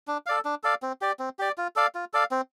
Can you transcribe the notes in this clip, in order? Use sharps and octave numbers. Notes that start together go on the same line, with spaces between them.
D4
A4 D5 F5
D4
A4 D5 F5
C4
G4 D5
C4
G4 D5
F4
A4 D5 F5
F4
A4 D5 F5
C4